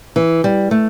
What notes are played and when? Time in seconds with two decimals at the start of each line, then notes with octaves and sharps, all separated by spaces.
0.16 E3
0.44 G3
0.71 A3